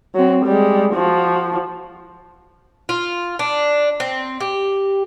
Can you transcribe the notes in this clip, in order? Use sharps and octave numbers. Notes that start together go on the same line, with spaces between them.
F#3 C4
G3 G#3
F3 F#4
F4
D4
C4
G4